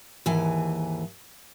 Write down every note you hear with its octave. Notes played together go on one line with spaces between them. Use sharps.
D#2 G#2 E3 G#5